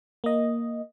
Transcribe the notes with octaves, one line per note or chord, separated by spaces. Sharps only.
A#3 D#5